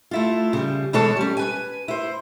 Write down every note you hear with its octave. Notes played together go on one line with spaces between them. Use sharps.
A3 E4 F4
C#3 G3
B2 E3 G#3 A4 C#5 A5
G3 C#4
B4 G#5
E4 C5